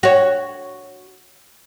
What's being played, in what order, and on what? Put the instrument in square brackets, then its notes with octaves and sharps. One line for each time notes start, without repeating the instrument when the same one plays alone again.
[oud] F#4 C#5